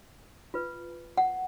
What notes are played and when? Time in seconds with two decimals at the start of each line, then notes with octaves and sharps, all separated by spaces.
0.54 F4 B4
1.17 F#5